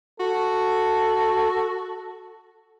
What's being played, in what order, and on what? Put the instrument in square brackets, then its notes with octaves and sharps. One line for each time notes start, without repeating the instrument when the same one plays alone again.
[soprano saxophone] F#4 [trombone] A4